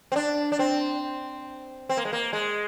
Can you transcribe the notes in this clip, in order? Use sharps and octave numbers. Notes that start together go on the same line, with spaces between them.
C4
D4
D4
C4
C4
A#3
G#3
A#3
G#3